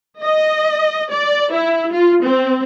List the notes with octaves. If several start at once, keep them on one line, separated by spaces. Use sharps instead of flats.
D#5
D5
E4
F4
C4